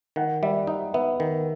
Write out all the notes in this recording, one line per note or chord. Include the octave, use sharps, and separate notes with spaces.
D#3 F#5
G3 E5
D#4 E5
B3 E5
D#3